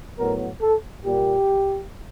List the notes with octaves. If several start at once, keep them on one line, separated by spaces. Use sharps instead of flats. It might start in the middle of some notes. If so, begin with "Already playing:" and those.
A2 F#3 B3 A#4
A4
A#2 G3 A#3 G4